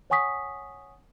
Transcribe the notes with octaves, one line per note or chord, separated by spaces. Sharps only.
C#5 F#5 G#5 C#6 D#6 B6